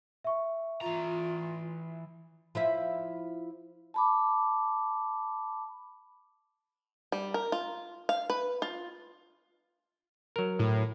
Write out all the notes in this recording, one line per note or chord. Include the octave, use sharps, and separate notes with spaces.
E5 C#6
E3 F4 A#5
F3 E4 E5
A5 B5 D6
G3
A#4
F4
F5
B4
F4
F#3 A#4
A2